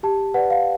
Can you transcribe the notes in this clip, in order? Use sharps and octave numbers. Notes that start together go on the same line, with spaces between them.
G4 A5
B4 D5 F#5
F5